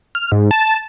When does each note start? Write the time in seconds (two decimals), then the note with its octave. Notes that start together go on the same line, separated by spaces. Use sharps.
0.15 F6
0.32 G#2
0.51 A5